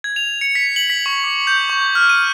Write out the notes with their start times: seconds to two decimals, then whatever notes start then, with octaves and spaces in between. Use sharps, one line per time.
0.04 G#6
0.16 F7
0.41 C#7
0.55 B6
0.76 F#7
0.90 B6
1.06 C#6
1.24 D6
1.47 G6
1.70 C#6
1.95 F6
2.09 D#7